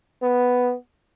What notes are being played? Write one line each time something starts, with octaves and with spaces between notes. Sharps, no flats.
B3